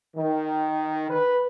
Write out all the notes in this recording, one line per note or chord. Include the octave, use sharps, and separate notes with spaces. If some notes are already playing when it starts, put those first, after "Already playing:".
D#3
B4